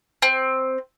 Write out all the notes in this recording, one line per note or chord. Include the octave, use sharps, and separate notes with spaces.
C4